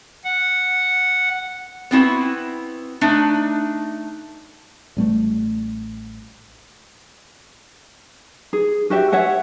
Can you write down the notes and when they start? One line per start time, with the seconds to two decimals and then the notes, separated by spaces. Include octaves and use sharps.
0.25 F#5
1.91 B3 C4 E4 F#4
3.01 A3 D4 D#4
4.97 A1 G3 A3
8.53 G#4
8.90 F#4 G4 E5
9.12 C#5 E5 F#5 G#5